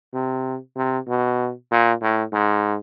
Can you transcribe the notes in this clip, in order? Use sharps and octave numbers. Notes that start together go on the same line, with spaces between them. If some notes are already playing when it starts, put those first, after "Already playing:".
C3
C3
B2
A#2
A2
G#2